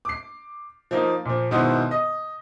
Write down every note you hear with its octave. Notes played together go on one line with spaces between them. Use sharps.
D6 C7
F3 A#3 D#4
A#2 F3
G#2 B2 D#3 B3 E4 C5
D#5